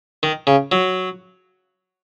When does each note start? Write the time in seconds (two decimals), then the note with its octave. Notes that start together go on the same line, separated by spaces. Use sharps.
0.23 D#3
0.47 C#3
0.72 F#3